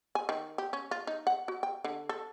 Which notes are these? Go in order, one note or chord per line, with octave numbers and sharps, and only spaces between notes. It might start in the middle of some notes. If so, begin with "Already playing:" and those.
G#5
D#3
G4
C#4
F4
D#4
F#5
F#4
G5
D3
A4